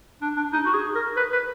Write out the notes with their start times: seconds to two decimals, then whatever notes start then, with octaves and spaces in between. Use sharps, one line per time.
0.21 D4
0.36 D4
0.53 D#4
0.65 F#4
0.74 G#4
0.95 A#4
1.17 B4
1.32 B4